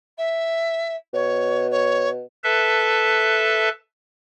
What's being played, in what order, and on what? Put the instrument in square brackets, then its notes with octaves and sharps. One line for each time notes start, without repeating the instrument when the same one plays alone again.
[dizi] E5
[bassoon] B2 [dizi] C#5
[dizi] C#5
[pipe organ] A4 B4 E5 A5